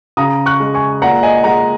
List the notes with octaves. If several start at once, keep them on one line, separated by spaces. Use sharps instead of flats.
C#3 A#5 D#6
C#6 F#6
G#3
G#5 C#6
A#2 F#5 A#5
D#5 G#5
G#3 F#5 A#5